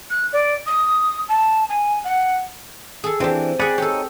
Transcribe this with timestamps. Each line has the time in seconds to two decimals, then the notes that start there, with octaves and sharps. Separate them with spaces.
0.10 F#6
0.32 D5
0.66 D#6
1.28 A5
1.69 G#5
2.04 F#5
3.04 G#4 A4
3.20 E3 C4 D4 G4
3.60 G#4 D5 F#5 G#5 B5
3.78 D#4 G4 A4 C#5